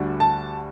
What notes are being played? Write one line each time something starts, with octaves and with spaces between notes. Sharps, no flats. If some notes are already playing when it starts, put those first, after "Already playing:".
Already playing: D2 D3 G3 D4 F#4
A5